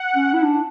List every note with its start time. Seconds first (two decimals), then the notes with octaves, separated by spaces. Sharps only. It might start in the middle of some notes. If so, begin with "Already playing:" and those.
Already playing: F#5
0.15 C#4
0.33 E4
0.43 D4